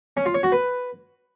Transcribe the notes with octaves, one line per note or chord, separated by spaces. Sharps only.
C#4
F4
C#5
F#4
B4